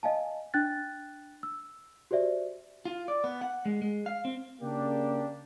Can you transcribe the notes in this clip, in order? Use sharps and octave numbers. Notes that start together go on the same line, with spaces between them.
D#5 F5 G#5 A5
D4 G5 F#6 A6
E6
F#4 G4 C5 D5 E5
F4
D5
B3
F#5
G#3
G#3
F5
C4
C#3 A#3 D4 G4